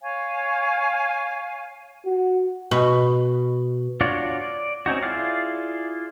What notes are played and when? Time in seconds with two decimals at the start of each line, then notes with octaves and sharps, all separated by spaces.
0.02 C#5 F5 G#5
2.06 F#4
2.71 B2
4.01 D4 F4 F#4 C#5 D5
4.41 D5
4.86 C4 C#4 D#4 F#4
5.03 E4 F4 G#4 D5 F5